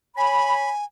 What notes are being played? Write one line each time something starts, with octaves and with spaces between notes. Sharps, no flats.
C#5 G#5 B5